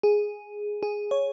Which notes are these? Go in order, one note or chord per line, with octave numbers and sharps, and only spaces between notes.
G#4
G#4
C#5